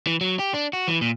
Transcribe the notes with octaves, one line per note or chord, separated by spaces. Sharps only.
E3
F#3
G4
D4
F#4
E3
A#2